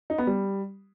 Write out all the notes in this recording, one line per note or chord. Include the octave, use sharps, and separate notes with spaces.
D#4
B3
G3